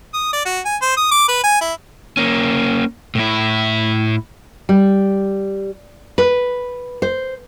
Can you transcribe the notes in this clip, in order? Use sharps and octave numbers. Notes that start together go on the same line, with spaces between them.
D#6
D5
F#4
G#5
C5
D#6
D6
B4
G#5
E4
A#3 C#4
A2 E4
G3
B4
C5